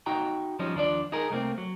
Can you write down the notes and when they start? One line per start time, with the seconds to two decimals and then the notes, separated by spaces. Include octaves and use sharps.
0.06 D#4 F#4 G5 A#5
0.59 F3 G3 C#4 D#4
0.75 D#2 F3 D4 D5
1.12 D#4 G#4 A#4
1.30 C2 A3 A#3 C4
1.58 F#3